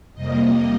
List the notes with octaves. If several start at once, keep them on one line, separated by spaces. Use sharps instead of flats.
F2 C3 G3 A#3 D#5